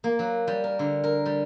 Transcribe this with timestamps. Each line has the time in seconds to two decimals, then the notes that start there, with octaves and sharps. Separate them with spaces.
0.04 A#3
0.19 F#3
0.47 G3
0.64 A#4
0.79 D3
1.04 A#4
1.26 G3